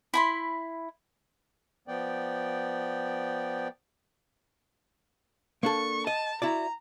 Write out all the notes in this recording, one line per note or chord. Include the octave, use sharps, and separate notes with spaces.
E4 B5 C6
F3 B3 D5 G5
A#3 D4 A4 C#6
D#5 A5
E4 F#4 D5 A#5